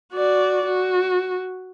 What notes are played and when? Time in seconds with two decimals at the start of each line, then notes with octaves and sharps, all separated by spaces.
0.13 F#4 D5
0.65 F#4